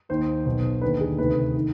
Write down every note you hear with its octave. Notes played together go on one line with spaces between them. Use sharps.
D#2 D#3 C5
B1 B2 C5
D#2 D3 B4
G#4
D2 C3 D#3 B4
D#3